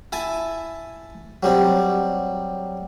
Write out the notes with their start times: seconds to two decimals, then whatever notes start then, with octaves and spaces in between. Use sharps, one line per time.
0.12 E4 G#5 A5
1.43 F#3 G3 C4